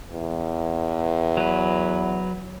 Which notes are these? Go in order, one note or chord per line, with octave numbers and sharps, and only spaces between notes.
E2
F#3 B4